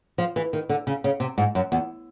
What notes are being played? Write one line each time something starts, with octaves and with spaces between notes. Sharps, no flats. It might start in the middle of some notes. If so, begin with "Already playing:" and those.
F3
E3
D#3
D3
C#3
C#3
C3
G#2
F#2
E2